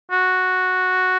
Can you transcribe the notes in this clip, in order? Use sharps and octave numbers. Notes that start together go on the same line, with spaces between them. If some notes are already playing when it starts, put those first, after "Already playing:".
F#4